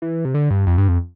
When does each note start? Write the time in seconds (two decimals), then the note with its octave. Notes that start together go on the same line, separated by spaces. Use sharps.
0.02 E3
0.25 C3
0.34 D3
0.51 G2
0.67 F2
0.78 G2
0.88 F2